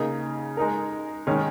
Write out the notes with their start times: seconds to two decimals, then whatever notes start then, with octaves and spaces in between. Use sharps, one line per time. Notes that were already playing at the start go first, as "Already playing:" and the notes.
Already playing: C#3 A#3 D#4 A#4
0.57 G#3 D#4 A#4
1.27 D#3 G#3 C#4